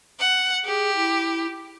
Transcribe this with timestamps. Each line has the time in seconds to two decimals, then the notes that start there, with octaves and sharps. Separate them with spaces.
0.20 F#5
0.65 G4 G#4
0.95 E4